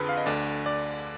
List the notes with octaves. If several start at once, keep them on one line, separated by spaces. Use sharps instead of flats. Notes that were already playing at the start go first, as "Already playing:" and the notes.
Already playing: F2 D3 G#4 B4
F5
D#5
D2 D3 D5
D5